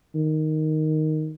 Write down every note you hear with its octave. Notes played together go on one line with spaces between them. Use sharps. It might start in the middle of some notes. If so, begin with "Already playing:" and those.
D#3